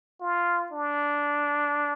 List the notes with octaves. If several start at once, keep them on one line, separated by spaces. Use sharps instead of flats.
F4
D4